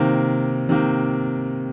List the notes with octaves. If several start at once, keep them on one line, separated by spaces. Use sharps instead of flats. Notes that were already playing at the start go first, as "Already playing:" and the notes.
Already playing: C3 D#3 A#3
C3 D#3 A#3